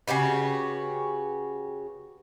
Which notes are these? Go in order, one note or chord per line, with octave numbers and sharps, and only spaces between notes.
C#3 F#4 G4 B4